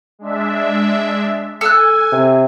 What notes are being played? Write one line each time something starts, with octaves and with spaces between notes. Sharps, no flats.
G#3 D4 E5
A4 G#5 E6 F#6
C3